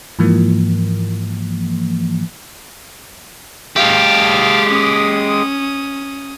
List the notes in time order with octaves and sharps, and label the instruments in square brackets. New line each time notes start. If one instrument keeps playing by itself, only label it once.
[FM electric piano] G#2 E3 F3 A#3
[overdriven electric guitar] G#3 G4 [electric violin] F5 A5
[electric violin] C#4 D#6